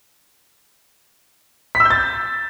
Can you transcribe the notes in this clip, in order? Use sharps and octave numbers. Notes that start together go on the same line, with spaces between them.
B6
E6
G6
A6